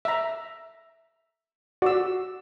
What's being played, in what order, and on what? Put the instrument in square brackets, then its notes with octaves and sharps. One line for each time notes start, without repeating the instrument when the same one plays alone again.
[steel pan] E5 A#5
[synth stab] F#4 [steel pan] D5 E6